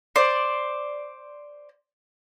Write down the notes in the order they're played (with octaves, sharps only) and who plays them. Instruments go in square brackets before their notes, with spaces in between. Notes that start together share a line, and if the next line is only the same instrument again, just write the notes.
[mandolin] C5 D5